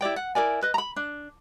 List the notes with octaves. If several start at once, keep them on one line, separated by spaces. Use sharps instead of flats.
E4 G4 D5 G5
F#5
E4 A#4 D5 G#5
B4 D#5
A#5 B5
D4